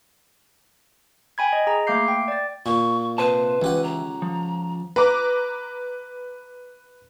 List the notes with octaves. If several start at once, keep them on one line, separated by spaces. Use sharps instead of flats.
G5 G#5 B5 G#6
D#5
G#4 A#5
A3 A#3 F5 D6 G6 C7
G5
D5 A6
A#2 C#6
C3 B4 C5 A5
C#2 E3 G4 F#5
A#5
F3
B4 A#5 D6